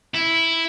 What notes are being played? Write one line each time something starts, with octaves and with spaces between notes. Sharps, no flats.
E4